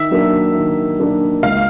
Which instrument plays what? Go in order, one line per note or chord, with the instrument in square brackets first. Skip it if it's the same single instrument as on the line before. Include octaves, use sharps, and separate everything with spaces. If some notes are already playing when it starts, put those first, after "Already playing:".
Already playing: [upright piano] D#3 [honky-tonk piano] E5
[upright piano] F#3 A#3 D4
D#3
F#3 A#3 D4
[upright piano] C#2 [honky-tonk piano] F5